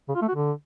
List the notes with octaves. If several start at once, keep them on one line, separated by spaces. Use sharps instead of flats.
C#3
F4
A3
F#4
D3